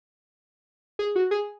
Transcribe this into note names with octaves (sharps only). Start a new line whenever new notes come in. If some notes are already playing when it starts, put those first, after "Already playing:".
G#4
F#4
G#4